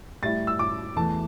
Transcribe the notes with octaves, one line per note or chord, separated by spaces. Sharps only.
A2 G3 E4 A6
E6
D6
E2 E3 A3 A5